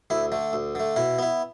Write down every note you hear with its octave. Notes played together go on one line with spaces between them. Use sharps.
D2 E4
D3 A3
D2
D3 A3
B2 E4
B3 E4